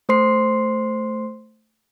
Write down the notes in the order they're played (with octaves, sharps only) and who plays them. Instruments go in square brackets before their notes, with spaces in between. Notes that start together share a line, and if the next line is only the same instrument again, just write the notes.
[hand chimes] A3 C5 C6 C7